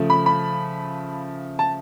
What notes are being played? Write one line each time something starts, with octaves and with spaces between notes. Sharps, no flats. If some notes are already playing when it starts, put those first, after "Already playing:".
Already playing: C#3 F3 A3
B5
B5
A5